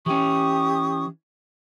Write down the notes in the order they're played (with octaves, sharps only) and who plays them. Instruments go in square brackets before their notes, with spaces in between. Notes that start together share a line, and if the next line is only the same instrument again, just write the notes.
[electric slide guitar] E3 C#4 [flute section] G4 C#6 D#6